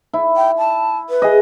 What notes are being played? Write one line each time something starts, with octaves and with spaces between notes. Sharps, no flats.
E4
G5
A5
B4
G#4 D#5